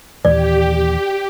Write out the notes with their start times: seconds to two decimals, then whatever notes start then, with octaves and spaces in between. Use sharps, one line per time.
0.25 D#2 A#2 E3 G4 D5